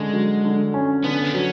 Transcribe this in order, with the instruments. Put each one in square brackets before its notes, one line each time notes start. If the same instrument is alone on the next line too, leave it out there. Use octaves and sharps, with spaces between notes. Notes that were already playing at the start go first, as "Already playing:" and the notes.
Already playing: [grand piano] D3 C#4 [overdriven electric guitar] G#3
[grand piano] F#3
D3
C#4
[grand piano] D3 [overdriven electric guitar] B3
[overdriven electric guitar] D4
[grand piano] F#3 [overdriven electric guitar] C#4